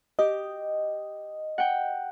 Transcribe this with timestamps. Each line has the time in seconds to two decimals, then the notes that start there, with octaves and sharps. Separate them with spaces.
0.19 G4 D#5
1.58 F#5 G5